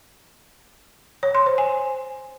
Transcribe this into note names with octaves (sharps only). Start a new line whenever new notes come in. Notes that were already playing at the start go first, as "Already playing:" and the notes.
C#5
C6
C5
G#5